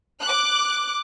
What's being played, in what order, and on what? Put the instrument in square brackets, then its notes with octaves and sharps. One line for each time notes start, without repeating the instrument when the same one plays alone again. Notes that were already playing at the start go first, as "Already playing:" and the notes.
[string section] D6 F#6